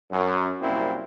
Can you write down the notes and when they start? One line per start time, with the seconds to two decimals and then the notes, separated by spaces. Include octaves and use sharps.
0.11 F#2
0.61 C2 F#2 A#2 C4 E4